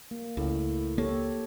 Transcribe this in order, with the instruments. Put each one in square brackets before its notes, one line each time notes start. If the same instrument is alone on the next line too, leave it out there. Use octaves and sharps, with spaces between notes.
[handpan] A#3
[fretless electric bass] C#2 [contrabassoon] A2
[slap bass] A#3 [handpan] G4 A4 C#5